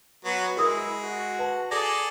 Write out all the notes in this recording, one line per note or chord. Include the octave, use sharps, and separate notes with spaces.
F#3 B3 F#4
G#3 E4 A#4 D#6
F#4
B4 A5
G#4 A4 D5 A#6